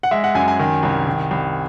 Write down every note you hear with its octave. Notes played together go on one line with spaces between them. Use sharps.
F#5
G#3 E5
F#5
F#2 G#5
G#5
D#3
C2
D#3
C2